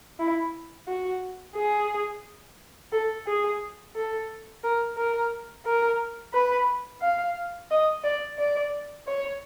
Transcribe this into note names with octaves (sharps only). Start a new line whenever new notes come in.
E4
F#4
G#4
A4
G#4
A4
A#4
A#4
A#4
B4
F5
D#5
D5
D5
C#5